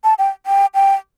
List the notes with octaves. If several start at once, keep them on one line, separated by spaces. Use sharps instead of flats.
A5
G5
G5
G5